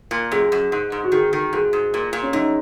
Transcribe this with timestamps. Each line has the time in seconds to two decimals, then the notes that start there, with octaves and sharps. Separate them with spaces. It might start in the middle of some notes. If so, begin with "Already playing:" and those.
0.11 A#2
0.32 F#2 G#4
0.52 F#2
0.72 G#2
0.92 G#2
1.04 F#4
1.12 D#3 G#4
1.33 D#3 G#4
1.53 G#2 G#4
1.73 G#2
1.94 A#2
2.13 A#2
2.23 C#4
2.33 F#2 D#4